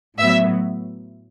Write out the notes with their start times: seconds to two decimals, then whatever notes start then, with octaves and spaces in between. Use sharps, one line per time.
0.18 A2 F#3 B3 E5